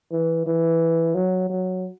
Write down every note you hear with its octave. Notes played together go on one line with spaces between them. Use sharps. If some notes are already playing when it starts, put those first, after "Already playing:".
E3
E3
F#3
F#3